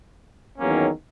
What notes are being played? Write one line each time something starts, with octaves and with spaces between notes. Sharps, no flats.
E2 D#3 F#3 A#3 C#4